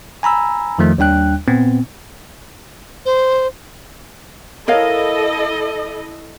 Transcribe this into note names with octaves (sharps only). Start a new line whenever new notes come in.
G#5 A#5 B5 E6
F2 D#3 F3 A3
D#2 G3 D4 G5 F#6
A#2 B3 C4
C5
E4 A4 A#4 C#5 D#5 F5